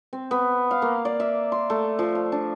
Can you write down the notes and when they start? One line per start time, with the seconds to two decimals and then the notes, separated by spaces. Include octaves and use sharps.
0.13 C4
0.31 B3
0.71 F5
0.82 A#3
1.05 D5
1.20 E5
1.52 C6
1.70 A3
1.99 F3
2.15 F5
2.32 D4